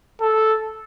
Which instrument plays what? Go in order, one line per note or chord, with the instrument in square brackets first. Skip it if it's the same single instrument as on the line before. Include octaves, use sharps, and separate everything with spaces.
[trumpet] A4